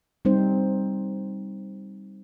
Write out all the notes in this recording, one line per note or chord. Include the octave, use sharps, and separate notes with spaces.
G3 C4 D#4 C5